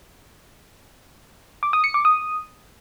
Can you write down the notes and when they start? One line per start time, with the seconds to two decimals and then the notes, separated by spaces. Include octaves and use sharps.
1.63 D6
1.73 D#6
1.84 C#7
1.94 D6
2.05 D#6